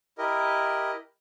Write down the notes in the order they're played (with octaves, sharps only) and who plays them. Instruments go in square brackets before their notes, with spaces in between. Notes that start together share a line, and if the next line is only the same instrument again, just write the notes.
[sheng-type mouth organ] E4 G4 A#4 D#5